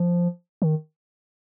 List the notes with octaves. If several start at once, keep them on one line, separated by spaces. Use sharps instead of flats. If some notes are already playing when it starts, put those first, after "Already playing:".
Already playing: F3
D#3